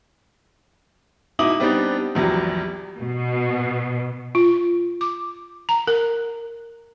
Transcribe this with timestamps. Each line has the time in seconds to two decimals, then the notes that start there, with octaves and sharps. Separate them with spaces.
1.39 B2 D#4 E4 D6 D#6 F#7
1.60 G3 B3 C4 D4 D#4 G4
2.15 A#1 E2 F#3 G3
2.99 B2
4.35 F4
5.01 D6
5.69 A#5
5.88 A#4